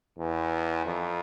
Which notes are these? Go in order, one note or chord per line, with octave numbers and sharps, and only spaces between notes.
E2
F2